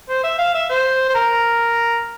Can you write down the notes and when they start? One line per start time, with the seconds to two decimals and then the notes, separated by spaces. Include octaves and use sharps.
0.09 C5
0.24 E5
0.38 F5
0.55 E5
0.70 C5
1.09 C5
1.15 A#4